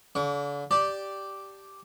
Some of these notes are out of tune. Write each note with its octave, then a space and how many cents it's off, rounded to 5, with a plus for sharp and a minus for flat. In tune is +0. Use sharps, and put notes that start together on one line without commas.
D3 -40 C#6 +45
G4 -5 D5 +0 A5 +0